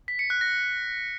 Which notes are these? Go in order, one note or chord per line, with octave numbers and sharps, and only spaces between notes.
B6
C#7
F#6
A#6